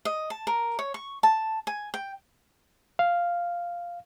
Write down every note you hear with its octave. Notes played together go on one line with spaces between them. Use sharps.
D#5
A5
A#4
C#5
C#6
A5
G#5
G5
F5